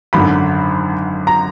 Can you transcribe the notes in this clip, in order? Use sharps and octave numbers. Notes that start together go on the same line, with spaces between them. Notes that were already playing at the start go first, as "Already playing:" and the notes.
G#1 F#2 D3 B5
A#5